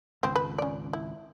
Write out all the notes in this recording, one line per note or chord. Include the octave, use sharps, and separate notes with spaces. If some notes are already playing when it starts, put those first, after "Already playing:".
G#1 C#2 B3 C4
B4
C#4 D5
E4